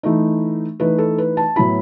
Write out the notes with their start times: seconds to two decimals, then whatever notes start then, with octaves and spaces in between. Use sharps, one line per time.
0.03 E3 A3 D#4
0.80 E3 A3 D#4 B4
0.98 A4
1.18 B4
1.37 A5
1.56 A2 F#3 B3 E4 B5